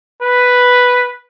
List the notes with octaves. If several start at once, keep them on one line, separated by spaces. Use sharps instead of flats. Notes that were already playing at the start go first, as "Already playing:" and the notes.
B4